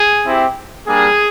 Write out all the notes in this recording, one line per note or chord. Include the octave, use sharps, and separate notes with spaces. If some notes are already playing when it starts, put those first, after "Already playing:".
Already playing: G#4
C4 E4 G4
G3 A#3 D4 G#4